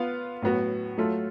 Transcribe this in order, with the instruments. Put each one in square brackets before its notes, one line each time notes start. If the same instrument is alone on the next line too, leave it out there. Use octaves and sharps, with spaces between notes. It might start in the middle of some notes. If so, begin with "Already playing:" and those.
Already playing: [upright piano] B3 F4 B4 F5
A2 F#3 B3 F#4
F#3 A3 F4 A4